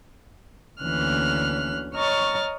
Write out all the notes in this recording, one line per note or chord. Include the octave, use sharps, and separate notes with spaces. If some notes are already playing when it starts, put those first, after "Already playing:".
D2 E3 A#3 C#4 F6 F#6
C#5 D#5 A#5 C#6 F6 A6